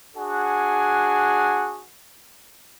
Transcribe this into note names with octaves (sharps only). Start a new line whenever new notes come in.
D4 F#4 G#4 F#5 G#5